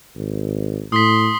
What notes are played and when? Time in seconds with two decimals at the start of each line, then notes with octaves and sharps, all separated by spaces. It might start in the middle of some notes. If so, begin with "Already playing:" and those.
0.16 G#1
0.92 A2 C6 D#6 B6